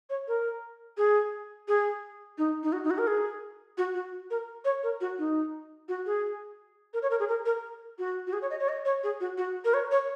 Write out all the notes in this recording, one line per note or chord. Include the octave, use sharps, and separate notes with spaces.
C#5
A#4
G#4
G#4
D#4
D#4
F#4
D#4
F#4
A#4
G#4
F#4
F#4
A#4
C#5
A#4
F#4
D#4
F#4
G#4
A#4
C#5
A#4
G#4
A#4
A#4
F#4
F#4
G#4
C#5
D#5
C#5
D#5
C#5
G#4
F#4
F#4
A#4
C#5
C#5